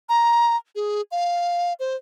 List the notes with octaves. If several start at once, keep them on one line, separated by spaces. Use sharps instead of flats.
A#5
G#4
F5
C5